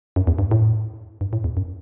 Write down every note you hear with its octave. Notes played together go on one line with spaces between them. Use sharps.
F#2
E2
G2
A2
G2
A2
E2
F#2